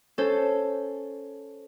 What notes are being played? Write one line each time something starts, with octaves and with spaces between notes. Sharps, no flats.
C#4 A4 C5